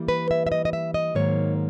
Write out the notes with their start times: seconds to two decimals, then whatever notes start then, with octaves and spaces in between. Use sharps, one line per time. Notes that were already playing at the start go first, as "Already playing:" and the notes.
Already playing: E3 G3 A#3
0.08 B4
0.31 E5
0.47 E5
0.52 D#5
0.65 D#5
0.73 E5
0.94 D#5
1.15 G#2 D#3 F#3 A#3 C#5